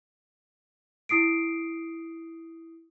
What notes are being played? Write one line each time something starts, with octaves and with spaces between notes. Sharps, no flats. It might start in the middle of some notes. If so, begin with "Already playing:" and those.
E4 D#6 C7 D7